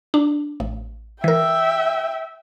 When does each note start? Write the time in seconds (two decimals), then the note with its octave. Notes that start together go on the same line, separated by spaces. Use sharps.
0.14 D4
0.60 A1
1.24 E3 A#4 E5 G5